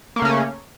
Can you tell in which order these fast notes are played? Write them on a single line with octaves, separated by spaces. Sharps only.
A#3 A3 C#3 C#4